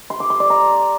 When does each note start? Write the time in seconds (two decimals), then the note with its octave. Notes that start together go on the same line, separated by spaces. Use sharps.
0.10 C6
0.20 D6
0.30 C6
0.40 D5
0.50 A#5